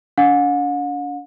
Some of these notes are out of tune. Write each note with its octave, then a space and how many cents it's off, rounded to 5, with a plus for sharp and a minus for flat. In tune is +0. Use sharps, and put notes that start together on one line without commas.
D4 -40 F#5 -45